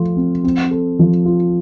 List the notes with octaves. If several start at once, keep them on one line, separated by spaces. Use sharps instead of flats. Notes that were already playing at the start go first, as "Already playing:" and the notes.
Already playing: F3 A3 F4
C4
C4
A4
F3
F4